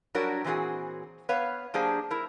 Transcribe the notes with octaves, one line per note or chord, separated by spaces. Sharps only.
F#3 G3 D4 F#4 A#4 C#5
A#2 E3 C4 D#4 F#4 G#4
B3 B4 C#5 F5
F#3 A#3 D4 G4 G#4 C5
E4 A#4